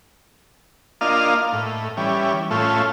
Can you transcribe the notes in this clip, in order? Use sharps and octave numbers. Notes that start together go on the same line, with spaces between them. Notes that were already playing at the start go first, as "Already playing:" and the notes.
A#3 D4 F4 D#5 F5
A2
E3 G3 C#4
A2 A3 C#4 F4